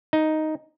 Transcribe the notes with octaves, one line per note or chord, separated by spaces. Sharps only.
D#4